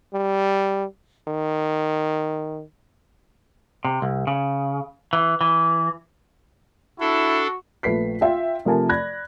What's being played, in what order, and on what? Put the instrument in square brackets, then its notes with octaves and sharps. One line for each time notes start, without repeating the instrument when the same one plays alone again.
[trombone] G3
D#3
[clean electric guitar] C3
C2
C#3
E3
E3
[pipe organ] D4 A4 [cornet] E4 [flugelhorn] F#4
[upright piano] A#1 A3 B4 B6 C7
F4 E5 G5
C3 F3 A3 A#4 G#5 A5
D5 B5 F#6 G#6 A#6